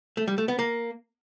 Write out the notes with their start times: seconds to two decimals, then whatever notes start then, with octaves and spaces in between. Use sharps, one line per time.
0.17 A3
0.28 G3
0.38 A3
0.48 B3
0.59 A#3